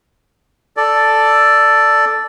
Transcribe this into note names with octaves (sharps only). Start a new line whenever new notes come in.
A4 D5